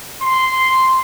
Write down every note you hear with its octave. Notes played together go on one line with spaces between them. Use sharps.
C6